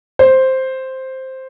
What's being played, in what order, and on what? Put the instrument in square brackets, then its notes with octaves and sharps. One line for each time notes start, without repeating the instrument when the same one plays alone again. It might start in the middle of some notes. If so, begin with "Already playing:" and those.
[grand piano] C5